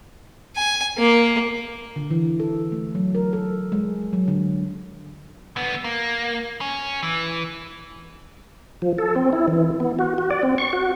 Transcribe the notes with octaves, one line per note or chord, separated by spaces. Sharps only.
G#5
A#3
D3
E3
A4
A3
F#3
A#4
A4
G#3
F#3
D3
D3 B3
A#3
C#4
E3
F3
A4
C4
E4
E3
B3
F#4
F#4
D5
C4
C#6
F#4